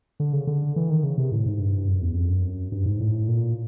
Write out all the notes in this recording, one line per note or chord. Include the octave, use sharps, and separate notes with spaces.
D3
C#3
D3
E3
D#3
C#3
C3
A2
G#2
G2
F#2
E2
F2
F#2
G2
G#2
A2
A#2